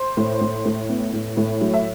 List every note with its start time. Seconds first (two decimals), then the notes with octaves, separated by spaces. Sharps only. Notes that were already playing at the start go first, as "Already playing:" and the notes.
Already playing: C5
0.17 A2
0.41 A2
0.65 A2
0.90 B3
1.13 A2
1.37 A2
1.61 F#3
1.74 E5